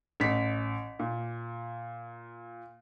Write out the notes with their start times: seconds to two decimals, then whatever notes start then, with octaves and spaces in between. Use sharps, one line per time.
0.20 A1 B6
0.99 A#2